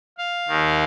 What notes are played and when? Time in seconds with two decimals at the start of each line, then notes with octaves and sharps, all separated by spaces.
0.18 F5
0.48 D#2 D#3